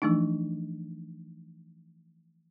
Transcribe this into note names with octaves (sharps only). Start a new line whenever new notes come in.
E3 F3 A3 D4 D#4